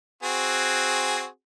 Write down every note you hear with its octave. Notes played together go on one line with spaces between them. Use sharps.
C4 F#4 G#4